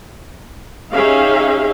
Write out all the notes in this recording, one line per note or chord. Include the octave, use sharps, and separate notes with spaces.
C#4 D#4 G4 G#4 E5 F5